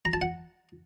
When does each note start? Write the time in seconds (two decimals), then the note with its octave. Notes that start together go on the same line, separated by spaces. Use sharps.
0.05 A#5
0.13 A5
0.21 F#5